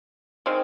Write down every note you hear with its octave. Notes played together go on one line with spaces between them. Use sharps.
D#3 G#3 C4